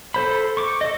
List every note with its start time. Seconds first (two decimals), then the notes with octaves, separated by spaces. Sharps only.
0.14 A4 C5 B5
0.57 C#6 D6
0.81 A4 D#5